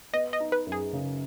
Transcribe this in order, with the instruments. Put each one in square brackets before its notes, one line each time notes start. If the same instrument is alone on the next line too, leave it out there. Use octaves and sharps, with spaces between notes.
[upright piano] B3 [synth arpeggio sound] D#5
[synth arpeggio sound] D#5
[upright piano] D#4
[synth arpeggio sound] B4
[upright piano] F#2
[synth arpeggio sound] G#4
[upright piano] C#3